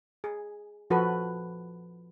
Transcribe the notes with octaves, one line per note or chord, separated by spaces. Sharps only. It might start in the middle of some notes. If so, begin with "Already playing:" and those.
G#4
F3 F#4 A4 B4